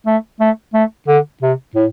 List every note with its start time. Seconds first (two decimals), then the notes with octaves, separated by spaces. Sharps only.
0.06 A3
0.40 A3
0.74 A3
1.08 D3
1.42 C3
1.75 A2